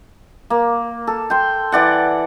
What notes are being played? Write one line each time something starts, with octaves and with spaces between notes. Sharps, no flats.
A#3
A4
G5 C6
E3 D5 F#5